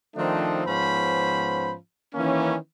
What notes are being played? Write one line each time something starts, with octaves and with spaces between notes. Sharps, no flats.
D#3 F3 A3 C4 D4 D#4
G#2 F3 B3 C#4 C5 B5
D#3 E3 A#3 C#4